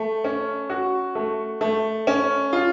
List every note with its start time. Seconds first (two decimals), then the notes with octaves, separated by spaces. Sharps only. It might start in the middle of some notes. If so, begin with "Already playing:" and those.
Already playing: A3
0.24 C#4
0.70 F#4
1.15 A3
1.61 A3
2.07 C#4
2.53 F4